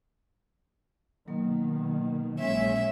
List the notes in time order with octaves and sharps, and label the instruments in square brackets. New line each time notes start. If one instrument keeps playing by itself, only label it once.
[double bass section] B2 D#3 [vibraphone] F#3 A#3
[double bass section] A#1 G#3 C#4 [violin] E5